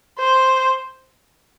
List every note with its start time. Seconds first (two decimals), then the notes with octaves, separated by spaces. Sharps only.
0.18 C5